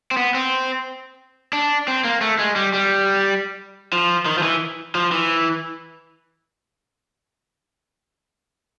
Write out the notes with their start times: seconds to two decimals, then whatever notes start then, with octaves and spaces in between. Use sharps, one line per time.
0.11 C4
0.17 B3
0.34 C4
1.53 D4
1.88 C4
2.04 A#3
2.21 A3
2.39 G#3
2.56 G3
2.73 G3
3.93 F3
4.26 D#3
4.38 F3
4.43 E3
4.95 F3
5.12 E3